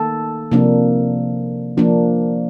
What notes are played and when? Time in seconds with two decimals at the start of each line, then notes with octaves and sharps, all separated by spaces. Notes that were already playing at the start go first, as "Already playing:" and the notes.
Already playing: D#3 A#3 A4
0.52 C3 F3 A#3 D4
1.78 F3 A#3 D4